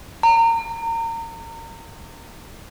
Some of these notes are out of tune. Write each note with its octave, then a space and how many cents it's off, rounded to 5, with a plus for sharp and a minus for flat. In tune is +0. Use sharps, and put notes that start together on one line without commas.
A#5 -30